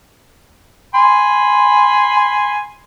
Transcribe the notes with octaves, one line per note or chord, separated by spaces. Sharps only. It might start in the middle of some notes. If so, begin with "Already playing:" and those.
G#5 B5 C6